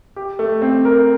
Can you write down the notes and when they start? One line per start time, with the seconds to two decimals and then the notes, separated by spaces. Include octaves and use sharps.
0.16 G4
0.39 A3
0.62 C4
0.85 A#4